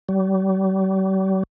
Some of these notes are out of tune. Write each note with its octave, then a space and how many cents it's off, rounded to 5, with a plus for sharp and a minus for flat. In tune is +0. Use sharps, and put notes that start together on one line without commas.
G3 -45